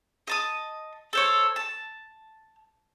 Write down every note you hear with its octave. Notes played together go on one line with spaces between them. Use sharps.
D#5 A5 D#6
A4 C5 C#5
A5